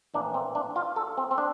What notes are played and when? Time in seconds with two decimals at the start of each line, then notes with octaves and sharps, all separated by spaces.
0.14 A#1 A2 E3 A#3 D4
0.34 C4
0.55 D4
0.76 F4
0.96 A4
1.18 C4
1.31 C4
1.38 D4